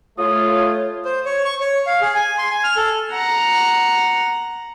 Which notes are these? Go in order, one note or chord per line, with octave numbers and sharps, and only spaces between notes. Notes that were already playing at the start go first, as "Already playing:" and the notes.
A3 F4 C#5 D#6
C5
C#5
C#6
C#5
F5
G#4
G#5
C6
G#5
F6
A4
F#5 A#5